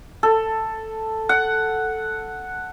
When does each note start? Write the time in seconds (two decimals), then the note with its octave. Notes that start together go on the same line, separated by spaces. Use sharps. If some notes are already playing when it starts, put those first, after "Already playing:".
0.23 A4
1.29 F#5